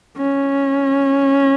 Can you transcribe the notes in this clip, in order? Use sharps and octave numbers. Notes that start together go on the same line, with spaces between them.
C#4